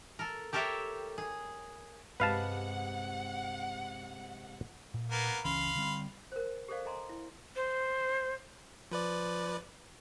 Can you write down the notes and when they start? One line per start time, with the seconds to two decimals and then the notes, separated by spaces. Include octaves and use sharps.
0.19 A4 A#4
0.53 G4 A4 A#4 C#5 E5 G5
1.18 G#4
2.20 G2 C3 G#3 B4 F5 F#5 A5
4.94 A#2
5.11 A#3 B3 A#4
5.45 C#2 E3 C#4 F5 B5 C6
5.76 D3 G3 C4
6.32 A#4 C5
6.68 G4 A4 A#4 C5 D5 F5
6.85 A4 D#5 G#5 A#5 C6
7.09 E4
7.56 C5
8.91 F3 B4 D5